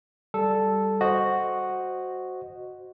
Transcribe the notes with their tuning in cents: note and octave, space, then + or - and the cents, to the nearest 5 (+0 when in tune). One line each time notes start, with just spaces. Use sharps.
G3 +0 A4 +0
F#4 +0 C5 +0 D#5 -10